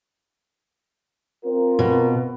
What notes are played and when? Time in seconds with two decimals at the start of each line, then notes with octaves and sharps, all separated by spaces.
1.45 C4 F4 A#4
1.79 B2